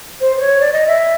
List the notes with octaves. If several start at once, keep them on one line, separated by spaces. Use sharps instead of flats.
C5
C5
C#5
D5
D#5
E5